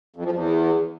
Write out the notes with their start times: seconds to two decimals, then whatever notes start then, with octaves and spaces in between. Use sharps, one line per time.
0.16 F2
0.25 F3
0.33 E2